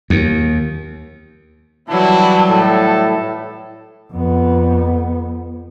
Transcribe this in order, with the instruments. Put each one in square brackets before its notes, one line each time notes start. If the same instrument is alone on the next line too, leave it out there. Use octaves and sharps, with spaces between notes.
[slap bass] D#2
[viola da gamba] E3 F#3 G3 [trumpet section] C4 D4 E4 [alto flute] A5
[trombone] A2 [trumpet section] A4
[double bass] F2 B3